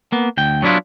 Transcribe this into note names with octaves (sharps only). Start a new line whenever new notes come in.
A#3 B3
D2 G5
F#3 B3 D4 E4 F4